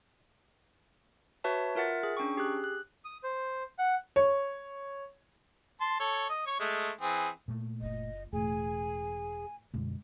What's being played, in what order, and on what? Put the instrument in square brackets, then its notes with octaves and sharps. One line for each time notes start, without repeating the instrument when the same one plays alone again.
[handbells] F#4 B4 C#5 E5 A5
F4 A#4 E5 F#5 A6
G#4
C#4 D4 G5 C#6
G4 G#4 F#6
F#6
[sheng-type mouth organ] D#6
C5
F#5
[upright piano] C#5
[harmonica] A5 C6
A4 C#5
D#5
C#5 C#6
G#3 A3
E3 C4 G#4
[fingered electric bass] A#2 A3
[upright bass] F#1 F4 [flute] D#5
[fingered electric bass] E1 [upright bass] A2 [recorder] G#4 [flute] G#5
[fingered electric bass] F#2 B2 D3 [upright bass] G#3